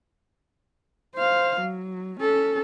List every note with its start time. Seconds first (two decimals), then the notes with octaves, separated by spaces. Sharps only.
1.15 C5 F5
1.60 F#3
2.19 C#4 A4